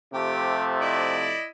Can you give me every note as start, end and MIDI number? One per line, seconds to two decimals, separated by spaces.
0.14 1.36 48
0.14 1.36 53
0.14 1.36 57
0.14 0.64 67
0.81 1.45 64
0.81 1.45 74
0.81 1.45 75